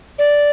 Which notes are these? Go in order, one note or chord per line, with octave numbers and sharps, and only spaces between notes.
D5